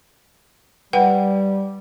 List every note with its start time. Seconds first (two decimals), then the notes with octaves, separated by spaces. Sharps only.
0.93 G3 B4 F#5 G5